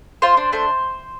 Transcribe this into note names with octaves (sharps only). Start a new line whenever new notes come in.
F4 C5
D4
A3 C5